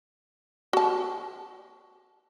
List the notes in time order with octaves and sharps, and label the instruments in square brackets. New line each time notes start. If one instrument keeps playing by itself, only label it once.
[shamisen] F#4 A5